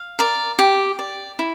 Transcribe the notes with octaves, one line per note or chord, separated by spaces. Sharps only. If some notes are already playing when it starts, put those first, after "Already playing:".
Already playing: F5
A#4 D5
G4
D5
E4